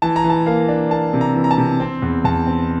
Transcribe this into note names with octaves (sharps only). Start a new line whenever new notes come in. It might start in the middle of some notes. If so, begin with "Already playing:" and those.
E3 A5
A#5
E3
A5
A#3 F5
D4
A#3 A5
C3
A#5
E3
A#5
A5
C3
C4
E2
E2 A5
C4